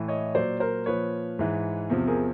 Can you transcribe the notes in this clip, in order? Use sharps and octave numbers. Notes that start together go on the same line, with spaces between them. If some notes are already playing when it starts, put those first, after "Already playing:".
Already playing: A2 E3
C#5 D#5
A#2 F#3 C5 D5
A#4 C5
A#2 F3 B4 C#5
G#2 E3
E2 C3 F3
G#4 A#4